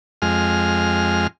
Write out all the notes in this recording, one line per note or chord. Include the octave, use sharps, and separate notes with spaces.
F2 G#3 F6